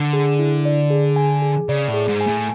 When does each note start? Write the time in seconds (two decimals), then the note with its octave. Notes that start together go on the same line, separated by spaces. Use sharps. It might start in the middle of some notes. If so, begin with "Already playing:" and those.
Already playing: D3
0.13 G#4
0.39 E4
0.65 D5
0.90 G#4
1.16 G#5
1.42 G#4
1.69 C#3 D5
1.88 A2
1.94 G#4
2.08 G#2
2.21 G#5
2.26 A2